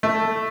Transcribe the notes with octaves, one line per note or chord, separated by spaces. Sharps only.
A3